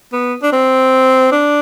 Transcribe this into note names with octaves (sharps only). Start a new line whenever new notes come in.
B3
D4
C4
D4